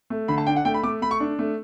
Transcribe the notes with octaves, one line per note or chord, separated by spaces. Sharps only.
A3
D3 B5
A5
D4 G5
F#5
A3 G5
B5
A3 D6
A3 B5
C#6
D4
A3